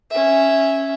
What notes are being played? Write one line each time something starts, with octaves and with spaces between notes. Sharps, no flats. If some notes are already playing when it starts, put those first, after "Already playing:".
C#4 E5